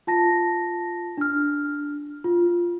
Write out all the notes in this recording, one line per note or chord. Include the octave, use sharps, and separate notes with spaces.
F4 A5 A#6
D4 F6
F4